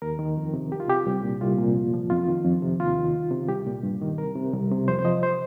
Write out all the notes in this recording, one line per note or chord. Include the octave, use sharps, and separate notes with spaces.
D#2 A#4
D#3
F2
C3
C2 G4
F4
C3 G4
C2
A#2
C2 F4
A#2
F2
F3
F2 F4
D#3
F2
C3
D#2 F4
D#3
C2
C3
C2 G4
A#2
G2
D#3
C2 A#4
C3
C2
C3
F2 C5
C5
F3 D#5
C5